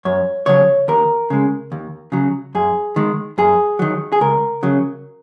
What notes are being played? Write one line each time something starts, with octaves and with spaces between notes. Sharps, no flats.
F#2 C#5
C#3 F#3 C#5
D#2 A#4
C#3 G#3
D#2
C#3 F#3
F#2 G#4
D#3 G#3
F#2 G#4
D#3 F#3
G#4
C#2 A#4
C#3 F#3